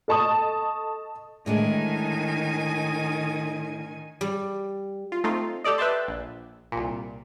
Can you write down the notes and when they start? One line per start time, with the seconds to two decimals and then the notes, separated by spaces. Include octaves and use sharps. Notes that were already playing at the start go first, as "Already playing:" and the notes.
0.08 A4 D#5 A5 C#6 D#6
1.46 A2 D3 D#3 G#3 G#5
4.21 G3
5.12 F4
5.24 A3 C4 D#4 F4
5.64 G4 A4 D5 D#5
5.78 B4 E5 G5 A5 C6
6.08 A#1
6.72 C2 A#2